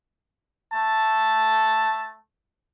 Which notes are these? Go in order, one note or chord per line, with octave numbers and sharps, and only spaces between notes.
A3 A5